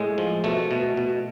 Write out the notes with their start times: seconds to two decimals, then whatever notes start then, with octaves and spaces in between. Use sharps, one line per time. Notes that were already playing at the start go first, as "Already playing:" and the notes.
Already playing: A2 G#3
0.18 F3
0.44 B2 A3
0.71 B2
0.97 B2